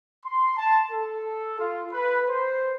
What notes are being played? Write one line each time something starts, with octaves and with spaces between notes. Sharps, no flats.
C6
A5
A4
F4
B4
C5